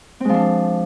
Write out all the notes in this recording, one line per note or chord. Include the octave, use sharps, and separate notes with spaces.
F3 G#3 C4 D4